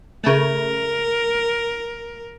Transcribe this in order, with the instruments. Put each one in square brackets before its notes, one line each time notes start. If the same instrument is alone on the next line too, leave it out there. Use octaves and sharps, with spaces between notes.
[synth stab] C#3 A3 [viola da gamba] A#4